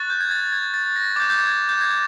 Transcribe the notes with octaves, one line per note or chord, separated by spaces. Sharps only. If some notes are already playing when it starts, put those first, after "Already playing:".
Already playing: C#6 F#6 A6
G6
G#6
A6
G#6
A6
A#6
D6 G6 A6
G6
G#6
G6
G#6